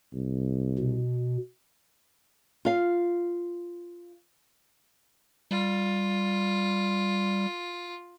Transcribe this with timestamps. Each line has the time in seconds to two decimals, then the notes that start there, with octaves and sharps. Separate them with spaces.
0.13 C2
0.79 B2
2.65 F4 F5
5.51 G3 F4